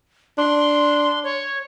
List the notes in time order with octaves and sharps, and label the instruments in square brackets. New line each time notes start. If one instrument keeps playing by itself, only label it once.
[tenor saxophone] D4 [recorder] C6
[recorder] C#5